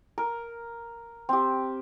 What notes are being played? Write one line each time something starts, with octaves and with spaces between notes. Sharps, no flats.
A#4
C4 G4